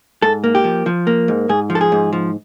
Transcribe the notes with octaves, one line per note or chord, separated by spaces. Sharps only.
G#2 A4
A#3
G4
F3
F3
A#3
G#2
G#2 G#4
F3
A4
G#4
G#2
F3